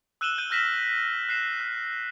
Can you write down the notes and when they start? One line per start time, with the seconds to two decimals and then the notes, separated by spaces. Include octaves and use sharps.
0.21 E6 F#6 D#7 E7 F#7 G7
0.38 G6 D#7
0.50 F6 G6 A#6 B6 E7 F#7
1.29 F#6 C7 E7
1.60 F#6